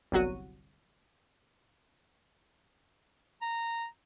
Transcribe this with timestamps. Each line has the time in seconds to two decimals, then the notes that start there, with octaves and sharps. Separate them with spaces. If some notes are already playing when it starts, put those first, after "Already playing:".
0.12 G1 C2 F#3 F#4 D#7
3.42 A#5